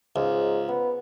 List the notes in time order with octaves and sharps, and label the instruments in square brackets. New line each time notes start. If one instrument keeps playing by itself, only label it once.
[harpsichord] C#2 [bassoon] G#2
[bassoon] B3